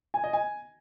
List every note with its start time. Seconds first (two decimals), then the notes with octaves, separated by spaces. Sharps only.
0.14 G#5
0.24 D#5
0.33 G#5